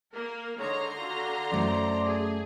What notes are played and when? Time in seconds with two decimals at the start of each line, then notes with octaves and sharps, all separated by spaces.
0.13 A#3 A#4
0.58 D3 G#3 D#4 C#5 A#5 C6
0.97 F4 F#4
1.52 F#2 A3 C5 D5
2.05 G#4